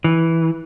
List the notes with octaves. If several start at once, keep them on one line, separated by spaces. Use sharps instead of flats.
E3